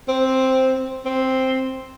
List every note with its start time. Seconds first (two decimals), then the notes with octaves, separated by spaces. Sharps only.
0.08 C4
1.05 C4